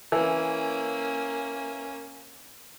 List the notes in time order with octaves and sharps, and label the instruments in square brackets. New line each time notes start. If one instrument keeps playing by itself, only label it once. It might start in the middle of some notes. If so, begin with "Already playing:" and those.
[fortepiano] E3 [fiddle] A#3 C#4